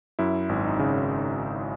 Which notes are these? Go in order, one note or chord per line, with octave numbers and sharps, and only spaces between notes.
F#2 E4
G#1
D#4
C#3